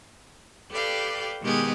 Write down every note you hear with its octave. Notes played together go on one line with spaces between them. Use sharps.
G4 A4 B4 D5 F5 G5
B2 D#3 G#3 B3 G4 G#4